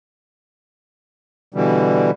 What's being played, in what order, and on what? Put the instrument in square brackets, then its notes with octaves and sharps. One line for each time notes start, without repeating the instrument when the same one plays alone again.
[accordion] B2 D3 E3 G3